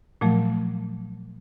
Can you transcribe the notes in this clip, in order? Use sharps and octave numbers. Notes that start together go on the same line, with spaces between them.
A#2 F3 F#3 A3